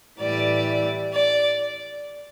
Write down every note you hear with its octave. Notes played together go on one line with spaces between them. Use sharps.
A2 E3 G3 D5
D5